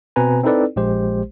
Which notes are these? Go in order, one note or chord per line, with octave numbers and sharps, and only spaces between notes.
B2 C4 B4 G#5 A#5
C4 D#4 E4 A4 B4 D5
A#1 G#3 G4 C5